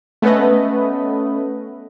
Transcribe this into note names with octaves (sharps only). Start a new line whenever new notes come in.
A3 B3 C#4 B4 D#5